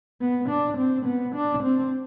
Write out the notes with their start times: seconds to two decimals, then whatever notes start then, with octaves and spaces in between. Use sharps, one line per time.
0.21 B3
0.49 D4
0.78 C4
1.06 B3
1.35 D4
1.63 C4